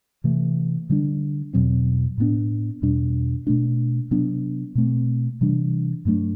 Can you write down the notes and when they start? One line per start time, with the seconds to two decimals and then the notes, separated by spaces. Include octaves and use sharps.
0.24 C3 E3 A3
0.90 D3 G3 D4
1.53 E2 B2 F#3 C4
2.18 A2 G3 B3 D4
2.82 E2 B2 G3 D4
3.47 B2 A3 D4
4.11 C3 F#3 B3 D4
4.75 B2 A3 C4
5.41 C3 E3 G3 D4
6.05 G2 F#3 A3 D4